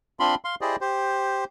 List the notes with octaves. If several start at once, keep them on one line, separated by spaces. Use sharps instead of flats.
C4 D4 F4 B5 C6
F5 C6
E4 G4 G#4 C5 D5 D#5
G4 C5